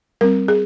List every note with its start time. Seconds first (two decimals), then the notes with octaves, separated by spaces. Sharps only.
0.21 G3 C4 A#4
0.48 G#4